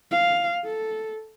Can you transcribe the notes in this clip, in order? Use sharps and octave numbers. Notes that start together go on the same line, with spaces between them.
F5
A4